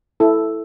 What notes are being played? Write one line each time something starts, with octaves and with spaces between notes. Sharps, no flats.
E4 A4